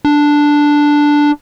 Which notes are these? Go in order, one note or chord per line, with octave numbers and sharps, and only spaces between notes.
D4